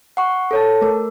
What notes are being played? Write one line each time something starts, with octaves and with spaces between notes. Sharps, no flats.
F#5 C#6
A4 C#5 A5
A3 A#4